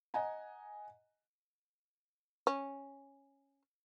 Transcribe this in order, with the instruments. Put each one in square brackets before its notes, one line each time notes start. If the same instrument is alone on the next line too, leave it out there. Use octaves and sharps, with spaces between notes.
[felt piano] D#5 F#5 G#5 A#5
[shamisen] C#4